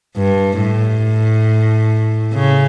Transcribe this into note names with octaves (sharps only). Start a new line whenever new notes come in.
G2
A2
C#3